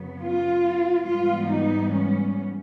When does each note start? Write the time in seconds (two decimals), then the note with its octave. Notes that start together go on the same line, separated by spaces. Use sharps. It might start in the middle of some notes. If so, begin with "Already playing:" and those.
Already playing: F#2 C#3 F#3 B3
0.19 F4
1.04 G#2 E3 G3 B3 F4
1.47 D#4
1.90 C#4